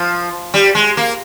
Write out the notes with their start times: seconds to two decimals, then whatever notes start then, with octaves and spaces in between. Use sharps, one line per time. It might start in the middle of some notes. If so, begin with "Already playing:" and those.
Already playing: F3
0.54 G3
0.75 G#3
0.97 A#3